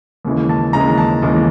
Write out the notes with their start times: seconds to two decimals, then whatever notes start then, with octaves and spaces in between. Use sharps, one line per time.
0.25 D#2 C#3 E3 G#3
0.49 A5
0.73 D#2 C#3 E3 G#3 A#5
0.98 A5
1.22 D#2 C#3 E3 G#3